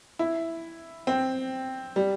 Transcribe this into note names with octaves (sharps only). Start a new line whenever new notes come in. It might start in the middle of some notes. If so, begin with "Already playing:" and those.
E4
C4
G3